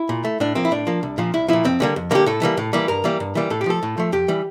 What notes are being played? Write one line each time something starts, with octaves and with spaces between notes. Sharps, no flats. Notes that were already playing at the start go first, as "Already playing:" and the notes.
Already playing: E4
A#2
A3
A2 D4
F3 A#3 C4
E4
A2 D4
F3 A#3
C2
A#2 F3
C2 E4
A#2 F3 E4
F2 C4
D3 G3 A#3
F2
D3 G3 A#3 G4
A2 A4
E3 G3 A#3
A2
E3 G3 A#3
G2 A#4
E3 G3 A#3
G2
E3 G3 A#3
A2 A4
G4
F3 A3 A4
A2
F3 A3
F2 G4
E3 G3